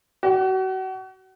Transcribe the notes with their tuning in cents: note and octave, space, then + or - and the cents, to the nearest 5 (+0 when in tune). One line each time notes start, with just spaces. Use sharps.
F#4 +35